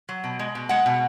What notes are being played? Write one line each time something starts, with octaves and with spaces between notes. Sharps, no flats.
F#3
B2
G#3
B2
G#3 F#5
B2